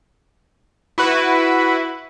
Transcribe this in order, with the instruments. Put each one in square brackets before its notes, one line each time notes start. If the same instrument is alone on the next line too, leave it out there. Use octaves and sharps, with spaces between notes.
[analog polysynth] E4 F#4 B4